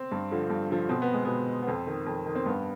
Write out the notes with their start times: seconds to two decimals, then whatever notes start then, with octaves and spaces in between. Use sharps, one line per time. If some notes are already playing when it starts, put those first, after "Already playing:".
Already playing: C4
0.11 G2
0.31 D3 F3
0.50 G2
0.70 D3 F3
0.89 B2 C4
1.02 B3
1.13 G#3
1.25 B2 B3
1.62 B3
1.67 F2 C4
1.87 D#3
2.07 F2
2.26 D#3
2.35 C4
2.46 G2 B3